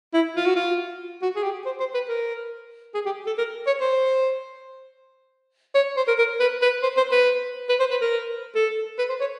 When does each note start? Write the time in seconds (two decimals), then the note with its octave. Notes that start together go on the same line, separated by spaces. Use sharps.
0.14 E4
0.36 F4
0.46 F#4
0.56 F4
1.22 F#4
1.36 G#4
1.43 G4
1.66 C5
1.80 C5
1.94 B4
2.09 A#4
2.94 G#4
3.05 G4
3.27 A4
3.38 A#4
3.67 C#5
3.81 C5
5.75 C#5
5.97 C5
6.08 A#4
6.18 A#4
6.40 B4
6.62 B4
6.83 C5
6.97 C5
7.11 B4
7.69 B4
7.80 C5
7.91 B4
8.01 A#4
8.55 A4
8.98 B4
9.09 C5
9.20 C#5